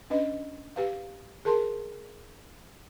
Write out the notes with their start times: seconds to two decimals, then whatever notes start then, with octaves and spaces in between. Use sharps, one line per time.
0.10 C#4 D4 B4 D#5
0.76 G4 B4 F5
1.45 G#4 A#4 A5 C6